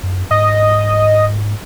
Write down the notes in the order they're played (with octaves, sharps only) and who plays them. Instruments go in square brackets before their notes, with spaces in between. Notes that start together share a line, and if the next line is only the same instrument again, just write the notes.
[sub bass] F#2
[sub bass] G#2 [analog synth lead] D#5